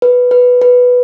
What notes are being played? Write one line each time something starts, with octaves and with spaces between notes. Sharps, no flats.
B4
B4
B4